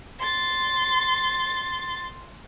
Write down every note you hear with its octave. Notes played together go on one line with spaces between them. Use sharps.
C6 A6